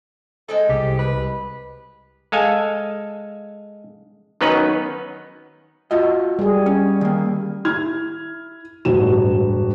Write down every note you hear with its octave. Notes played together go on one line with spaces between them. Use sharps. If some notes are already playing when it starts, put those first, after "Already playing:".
G#3 C4 A4 D#5
C2 G4
B4
G#3 A4 F5 G#5
D#3 F#3 B3 C#4 D#4 B4
F4 F#4 D#5
G3 G#4
C#4
D#3 A#3
E4 F6 G#6
E1 A1 G2 F#4 E7